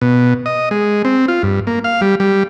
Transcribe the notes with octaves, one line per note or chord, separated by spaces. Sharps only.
B2
D#5
G#3
C4
F4
G2
A#3
F5
G3
G3